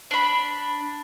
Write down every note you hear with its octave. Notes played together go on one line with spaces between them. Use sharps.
D4 B5